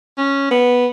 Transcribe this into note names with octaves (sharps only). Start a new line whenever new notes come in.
C#4
B3